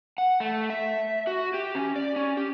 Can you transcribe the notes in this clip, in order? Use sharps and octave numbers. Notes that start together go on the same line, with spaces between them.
F#5
A3
E5
F#4
G4
C#4
D5
C#4
G4